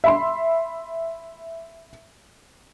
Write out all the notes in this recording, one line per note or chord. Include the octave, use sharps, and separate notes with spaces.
E5 B5 C6